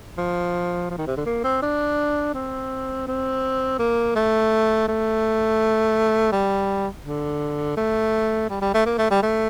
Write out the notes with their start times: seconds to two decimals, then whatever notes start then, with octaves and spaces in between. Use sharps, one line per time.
0.18 F3
0.90 F3
0.98 D#3
1.07 C3
1.17 D3
1.26 A#3
1.44 C4
1.63 D4
2.34 C4
3.07 C4
3.79 A#3
4.16 A3
4.88 A3
6.32 G3
7.05 D3
7.77 A3
8.50 G3
8.61 G3
8.74 A3
8.86 A#3
8.98 A3
9.11 G3
9.23 A3